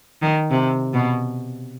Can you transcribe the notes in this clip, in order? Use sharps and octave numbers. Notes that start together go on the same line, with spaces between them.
D#3
C3
B2